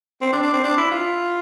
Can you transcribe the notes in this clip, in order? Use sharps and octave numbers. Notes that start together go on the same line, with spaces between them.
C4
D4
D4
C4
D4
E4
F4